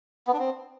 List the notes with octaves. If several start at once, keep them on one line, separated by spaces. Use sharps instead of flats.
B3
D4
C4